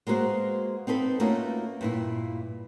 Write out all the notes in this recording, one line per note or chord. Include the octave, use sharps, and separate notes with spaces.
G#3 A#3 B3 F#4 C5
C4 D#4 A4 B4
A3 A#3 C#4 D#4 F4 F#4
G2 A#2 E4